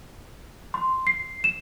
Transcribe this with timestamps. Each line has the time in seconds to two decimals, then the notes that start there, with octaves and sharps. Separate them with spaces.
0.74 C6
1.07 C7
1.44 E7